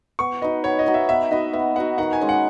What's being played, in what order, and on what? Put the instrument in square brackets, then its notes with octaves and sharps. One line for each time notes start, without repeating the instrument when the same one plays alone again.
[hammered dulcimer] B3 [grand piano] C#6
[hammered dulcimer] D#4 F#4 B4 [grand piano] D#5
[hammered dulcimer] B3 [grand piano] C#5
[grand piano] D#5
[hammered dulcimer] D#4 F#4 B4
[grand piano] E5
[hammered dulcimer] B3 [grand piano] E5
[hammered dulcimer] D#4 F#4 B4 [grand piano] D#5
[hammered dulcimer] B3 [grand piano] E5
[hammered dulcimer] D#4 F#4 B4 [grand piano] F#5
[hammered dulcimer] D#3 [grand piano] F#5
[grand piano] G#5
[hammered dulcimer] G#3 C#4
[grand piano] F#5